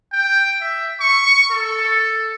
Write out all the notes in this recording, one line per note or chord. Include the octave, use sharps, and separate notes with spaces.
G5
E5
C#6
A4